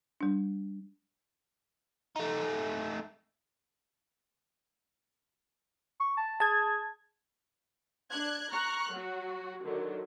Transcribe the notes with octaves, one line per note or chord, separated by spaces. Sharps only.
G3 D4
A3 D#4
C#6
A5
G#4 A5 G#6
D4 F#6 G#6
A#5 C#6 F6 F#6
F#3 F#4
D3 D#3 F#3